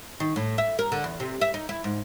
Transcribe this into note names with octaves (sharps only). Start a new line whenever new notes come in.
D#3
A2
E5
A#4
D3
E2
C3
E5
D#4
E4
G#2